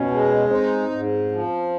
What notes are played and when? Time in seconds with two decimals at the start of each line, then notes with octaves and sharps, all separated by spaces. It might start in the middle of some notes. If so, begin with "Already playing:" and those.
Already playing: B2 C#4
0.10 G#3
0.50 C4 D#4
0.91 G#2
1.31 F3